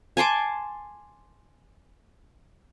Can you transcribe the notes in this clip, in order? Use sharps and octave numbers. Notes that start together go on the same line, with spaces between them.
G#5 A5 C6 D6